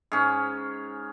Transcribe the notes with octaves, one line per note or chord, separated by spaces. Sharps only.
G#2 C#4